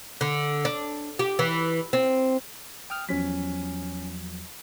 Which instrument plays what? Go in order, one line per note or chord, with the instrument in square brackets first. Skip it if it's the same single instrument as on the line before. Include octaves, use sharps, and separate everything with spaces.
[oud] D3
D4
G4
E3
C4
[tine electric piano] G5 D#6 F6
[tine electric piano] E2 F3 F#3 [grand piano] C#4 B6